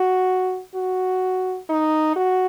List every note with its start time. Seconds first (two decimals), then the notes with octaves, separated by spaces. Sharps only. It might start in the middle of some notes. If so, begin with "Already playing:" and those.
Already playing: F#4
0.75 F#4
1.70 D#4
2.16 F#4